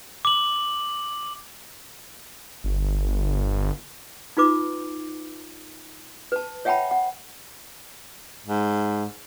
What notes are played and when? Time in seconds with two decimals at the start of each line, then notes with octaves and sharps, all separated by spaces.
0.25 D6 F#7
2.64 G1
4.37 D#4 F4 B4 D6
6.32 B4 A5
6.65 C#5 E5 F#5 G5 A5 B5
6.91 F#5
8.46 G#2